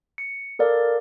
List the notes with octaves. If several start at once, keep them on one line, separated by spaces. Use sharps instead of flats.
C#7
A4 A#4 D5 F5